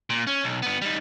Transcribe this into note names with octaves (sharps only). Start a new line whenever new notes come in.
A#2
C#4
B1
G2 B3
G3 D#4